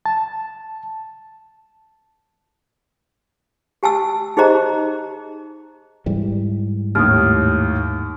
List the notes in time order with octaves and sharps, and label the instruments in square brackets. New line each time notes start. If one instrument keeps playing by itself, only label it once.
[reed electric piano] A5
[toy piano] G4 G#5 A5 E6
D#4 G4 G#4 C5 D#5 A#5
[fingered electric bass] G#2 E3 G3
[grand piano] D#2 A2 [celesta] D#6 F6